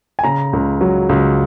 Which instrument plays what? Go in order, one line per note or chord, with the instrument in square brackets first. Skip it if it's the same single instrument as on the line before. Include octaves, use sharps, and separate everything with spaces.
[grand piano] G#5
C#3 A#5
C#2
F#3
C#2